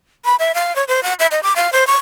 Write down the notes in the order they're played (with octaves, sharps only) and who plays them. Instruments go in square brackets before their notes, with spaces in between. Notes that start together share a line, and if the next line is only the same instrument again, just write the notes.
[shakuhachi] B5
E5
F5
C#5
C5
F#5
E5
D#5
D6
F5
C5
C#6